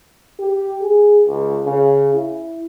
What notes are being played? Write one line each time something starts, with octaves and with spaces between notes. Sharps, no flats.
G4
G#4
C#2
C#3
E4